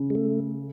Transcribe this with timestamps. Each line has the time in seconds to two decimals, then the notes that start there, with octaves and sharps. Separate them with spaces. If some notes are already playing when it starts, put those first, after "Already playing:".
Already playing: C#3
0.10 G#3
0.15 A3